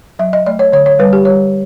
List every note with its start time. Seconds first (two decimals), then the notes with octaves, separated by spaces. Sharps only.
0.19 F#3 E5
0.33 D#5
0.46 A3 D5
0.59 C#5
0.72 D3 C#5
0.86 C#5
0.99 G3 B4
1.13 G4
1.25 G3 C#5